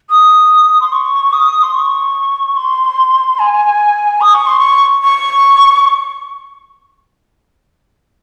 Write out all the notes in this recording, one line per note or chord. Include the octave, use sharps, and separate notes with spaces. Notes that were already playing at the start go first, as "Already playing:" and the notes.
D#6
C6
C#6
D#6
C6
C#6
C6
G#5
D#6
C#6
C6
C#6
C#6